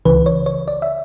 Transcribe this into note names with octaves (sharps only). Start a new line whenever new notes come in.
C#2 C#3 E3 B4
C#5
C#5
D5
E5